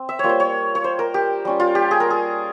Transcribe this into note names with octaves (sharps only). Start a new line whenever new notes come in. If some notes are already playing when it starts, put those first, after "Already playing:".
Already playing: C4
E5
G3 A#3 F4 C#5
C5
C#5
C#5
C5
A#4
G4
G3 C#4 F4
F4
G4
G#4
A#4
G#4